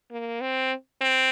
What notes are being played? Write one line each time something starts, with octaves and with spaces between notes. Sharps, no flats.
A#3
C4
C4